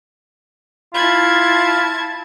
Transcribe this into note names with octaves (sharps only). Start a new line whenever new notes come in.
E4 F4 A5 B5 G#6